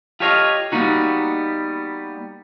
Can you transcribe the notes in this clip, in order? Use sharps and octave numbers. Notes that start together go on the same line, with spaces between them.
F4 G4 A4 C#5 D#5 F5
G3 A#3 B3 D#4 F#4